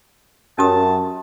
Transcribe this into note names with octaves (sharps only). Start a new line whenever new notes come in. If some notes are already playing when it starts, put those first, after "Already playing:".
F#2 C#4 G4 A5 D#6